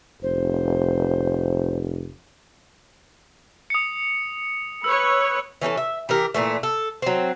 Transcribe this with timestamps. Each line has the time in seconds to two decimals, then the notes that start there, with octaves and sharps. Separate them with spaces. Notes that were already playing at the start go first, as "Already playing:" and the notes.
0.22 F1 C5
3.70 D#6 C#7
4.84 B4 C#5 E6
5.61 E3 C#4 D#4 A4
5.77 E5
6.09 E3 G4 A#4
6.34 A#2 E3 A3
6.63 A4
7.02 F#3 C4